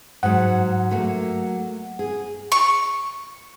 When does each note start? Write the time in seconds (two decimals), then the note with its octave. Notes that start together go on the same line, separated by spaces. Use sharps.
0.23 G#2 F#3 F#5
0.91 F#3 A3 A#3
1.99 G#4
2.52 C#6